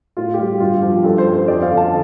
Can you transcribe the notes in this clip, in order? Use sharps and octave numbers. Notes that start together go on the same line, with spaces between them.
A2 F4
G4
G3 F4
G2 F4
F3 G4
G2 A4
C5
G3
C5
F2 D5
F5
D3
A5